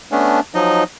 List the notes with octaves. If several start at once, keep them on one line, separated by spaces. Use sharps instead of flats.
A3 B3 C#4 D4
F3 F#3 D#4 D#5